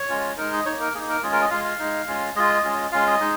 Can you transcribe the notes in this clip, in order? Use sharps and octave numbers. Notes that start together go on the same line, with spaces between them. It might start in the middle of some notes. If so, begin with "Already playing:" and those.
Already playing: C#5
G#3 C#4 F4
G#3 D#4 A#4
D#5
A#3 D#4 C#5
A#4
A#3 D#4 G#4
A#4
G#3 C#4 F4 G#4
A#4
D#5
G#3 F4 F5
F5
G#3 D#4
G#3 C#4 F4
G#3 F4 D#5
G#3 C#4 F4
G#3 C#4 F4 F5
D#5
G#3 D#4